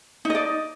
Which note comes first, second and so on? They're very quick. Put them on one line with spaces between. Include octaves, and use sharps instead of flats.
D#4 D#5 D5